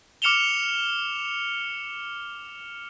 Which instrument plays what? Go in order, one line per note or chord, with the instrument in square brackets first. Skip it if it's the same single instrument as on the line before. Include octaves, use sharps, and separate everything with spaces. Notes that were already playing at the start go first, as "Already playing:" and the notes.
[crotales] D6 F6 C#7 E7 F7 G7